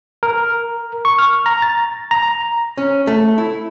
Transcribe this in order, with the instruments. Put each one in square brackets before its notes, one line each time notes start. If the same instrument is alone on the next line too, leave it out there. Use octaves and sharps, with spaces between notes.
[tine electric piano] A#4
C#6
F6
A#5
A6
A#5
[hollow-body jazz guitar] C#4
A3
E4